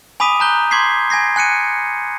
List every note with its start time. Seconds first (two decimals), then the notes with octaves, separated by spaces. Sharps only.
0.20 G#5 B5 D6 D#6 B6 D#7
0.40 G#5 A#5 F#6 G6 G7
0.71 C6 D6 G#6 B6 C7
1.10 G#5 G#6 A#6 C7
1.36 G#5 F#6 C#7 D#7